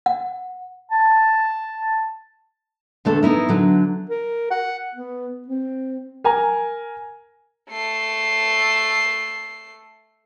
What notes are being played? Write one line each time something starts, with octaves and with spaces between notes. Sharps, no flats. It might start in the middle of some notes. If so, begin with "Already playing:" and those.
F#5
A5
E2 D3 A3 A4
B3 D#4 E4 A#4
D3 F#3
A#4
F#5
B3
C4
A#4 G#5 A#5
A3 C7